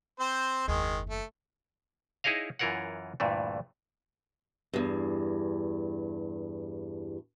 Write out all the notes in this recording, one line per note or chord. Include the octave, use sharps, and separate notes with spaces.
C4 C5
F#1 D#2 D#3 G#3
A3
D#4 E4 G#4 C#5 D#5 F5
F#2 E3 F4 A#4 C#5 F#5
D2 G2 A#2 E3 A3
E2 G2